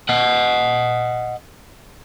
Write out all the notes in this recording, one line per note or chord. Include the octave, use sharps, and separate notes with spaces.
D#5 F#5